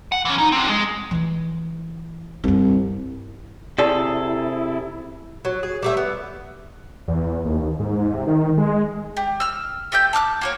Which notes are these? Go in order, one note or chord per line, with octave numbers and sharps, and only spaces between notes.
F#5
E3 C#4
D#4
C4 D4
G#3
E3 E4
C2 G2 D#4
C3 E4 G#4 A4 D5
F#3
G#4
G3 A3 E5
B3
E2
D#2
G#2
G#2
C3
D#3
G#3
G4
E6 F6
A3 G4 E6 G6
A5 D6 F6 F#6
A#3 F#4 C#5